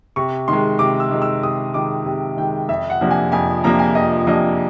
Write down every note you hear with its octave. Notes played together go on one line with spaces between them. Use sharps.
C3 C#6
D#3 G#3 C6
C3 D6
E6
D#3 G#3
E6
C3 D#6
D#3 G#3 D6
C3
D#3 G#3 G5
F2 E5
F#5
C3 F3 A#3 D4
G#5
F2 G#5
C3 F3 A#3 D4 A#5
G#5
F2 D#5
C3 F3 A#3 D4 D#5